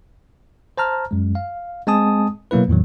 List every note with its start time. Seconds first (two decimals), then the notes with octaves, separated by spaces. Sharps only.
0.78 C5 A5 A#5 F6
1.11 F#2 G#3
1.35 F5
1.87 G#3 C4 G#5 A5 D#6
2.51 B2 F#3 A#3 E4 B4
2.68 E2 A2 D#3 F#3